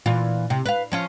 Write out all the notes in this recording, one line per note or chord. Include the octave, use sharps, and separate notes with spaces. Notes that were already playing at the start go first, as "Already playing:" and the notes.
A#2 E3 F4
C3
B4 F5
F3 C#4 F4